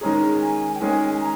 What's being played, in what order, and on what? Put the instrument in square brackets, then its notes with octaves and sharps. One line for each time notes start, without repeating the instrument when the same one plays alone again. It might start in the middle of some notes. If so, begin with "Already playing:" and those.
[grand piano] D#3 G#3 C#4 G#4 [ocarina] A#5
[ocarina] G#5
G5
[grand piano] D#3 G#3 C#4 G#4 [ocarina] G#5
[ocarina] G#5
A#5